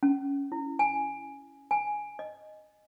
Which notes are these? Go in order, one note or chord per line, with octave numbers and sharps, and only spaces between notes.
C#4
E4
G#5
G#5
D#5